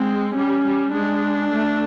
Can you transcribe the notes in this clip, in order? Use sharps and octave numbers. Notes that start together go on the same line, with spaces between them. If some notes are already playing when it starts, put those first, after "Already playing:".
Already playing: G#3 C4
G3 C#4
G3
G#3 D4
A3